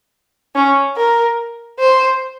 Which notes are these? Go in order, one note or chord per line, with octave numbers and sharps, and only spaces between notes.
C#4
A#4
C5